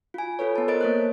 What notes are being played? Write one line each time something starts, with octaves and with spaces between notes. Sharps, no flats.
F4 G#5
F4 A4 B4 C#5
B3 A5
A#4 C5 D#5 A6 D7
A#3 C#5 F#6